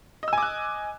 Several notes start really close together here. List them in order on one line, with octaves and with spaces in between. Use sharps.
D#5 E6 G#5 D6 F#6